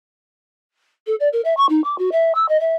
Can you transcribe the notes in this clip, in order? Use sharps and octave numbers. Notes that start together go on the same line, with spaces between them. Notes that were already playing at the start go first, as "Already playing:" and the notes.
A4
D5
A#4
E5
C#6
D#4
D6
F#4
E5
E6
D#5
E5